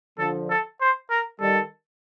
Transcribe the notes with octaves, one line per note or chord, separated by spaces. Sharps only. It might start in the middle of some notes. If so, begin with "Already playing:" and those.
D3 F3 A4
A4
C5
A#4
D#3 G3 A4